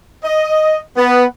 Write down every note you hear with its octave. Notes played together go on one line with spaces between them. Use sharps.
D#5
B3